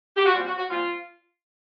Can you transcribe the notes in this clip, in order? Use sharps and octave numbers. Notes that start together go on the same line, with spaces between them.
G4
F#4
A#2 G3 C4 F4
F#4
F#4
A#2 G3 C4 F4